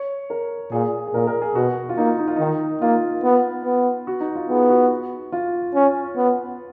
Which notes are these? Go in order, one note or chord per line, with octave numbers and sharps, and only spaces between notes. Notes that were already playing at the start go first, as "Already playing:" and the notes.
Already playing: C#5
A#4
A#2 G#4
G#4
A#2 A#4
A#4
G#4
B2 F#4
F4
A#3 D#4
D#4
F4
D#3 D#4
A#3 F4
B3
B3
F#4
D#4
F4
B3 G#4
F#4
F4
C#4
B3